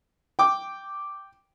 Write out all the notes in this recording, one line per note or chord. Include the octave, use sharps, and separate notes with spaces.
G5 D6